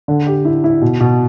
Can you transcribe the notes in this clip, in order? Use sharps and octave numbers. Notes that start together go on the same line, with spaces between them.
D3
G4
E4
E4
B2
B2